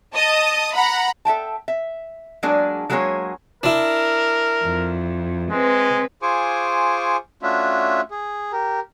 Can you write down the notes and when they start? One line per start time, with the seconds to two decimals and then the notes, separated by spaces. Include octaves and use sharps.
0.15 D#5 A5 D#6
0.74 F#5 A#5 B5
1.25 A4 E5 G5 A5
1.68 E5
2.43 F#3 G#3 A#3 D4 G#4 D5
2.90 F#3 G#3 A#3 D4 G#4 C#5
3.63 D4 E4 A#4
4.63 F2
5.51 G#3 C4 B4
6.22 F4 G#4 C5 G#5 C#6 D6
7.42 A3 C#4 D4 F4 F#4 E5
8.11 G#4
8.53 G4 A#4